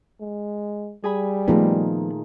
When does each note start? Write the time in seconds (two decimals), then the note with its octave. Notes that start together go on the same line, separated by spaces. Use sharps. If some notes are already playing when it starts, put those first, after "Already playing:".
0.21 G#3
1.04 G3 G#4 G#5 B5
1.48 A#2 D#3 F3 A3 B3 D#4 G#4